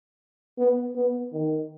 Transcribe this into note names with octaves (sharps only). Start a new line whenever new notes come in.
B3
B3
D#3